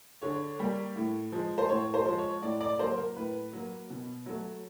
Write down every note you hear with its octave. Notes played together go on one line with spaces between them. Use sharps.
D3 C#5
G3 A#3
A2
F3 G#3
C5
A2 C#5
C5
F3 G#3
C#5
A2 D5
D5
F#3 A#3 C5
A#4
A2 B4
F#3 A#3
B2
F#3 A3